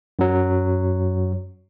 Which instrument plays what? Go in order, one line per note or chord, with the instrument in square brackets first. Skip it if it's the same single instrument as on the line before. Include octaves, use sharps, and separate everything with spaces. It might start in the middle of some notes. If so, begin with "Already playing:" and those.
[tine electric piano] F#2 F#3